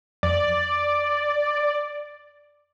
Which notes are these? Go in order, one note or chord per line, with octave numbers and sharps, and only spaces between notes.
F2 D5